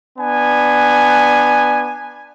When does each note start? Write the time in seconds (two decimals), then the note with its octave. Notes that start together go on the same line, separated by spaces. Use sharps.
0.19 B3 D4 G#5